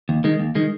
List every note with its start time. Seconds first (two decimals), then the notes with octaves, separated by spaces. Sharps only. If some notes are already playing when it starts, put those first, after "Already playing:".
0.09 D#2
0.24 D#3 G#3
0.39 D#2
0.55 D#3 G#3